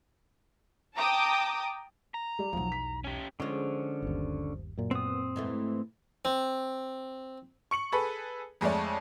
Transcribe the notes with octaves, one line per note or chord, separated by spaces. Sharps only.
G5 A5 A#5 D6 D#6
A#5
G3 D5
B1 E2 F3 F#3
B6
C#4 G4
D3 F3 G#3 C#4
G1 D#2
F#2 A#2
B3 C4 D#6
G#2 E3 A3
C4
C#6 C#7 F#7
G#4 A4 B4 B5
F2 G#3 A3 C#5 D5